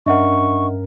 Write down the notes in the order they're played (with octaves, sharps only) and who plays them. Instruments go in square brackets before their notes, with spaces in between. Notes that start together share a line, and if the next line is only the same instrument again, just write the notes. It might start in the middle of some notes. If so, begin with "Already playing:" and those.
[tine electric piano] G2 C#4 A#4 [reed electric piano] D4 [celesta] D#5 E5 F#5 [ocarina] C#6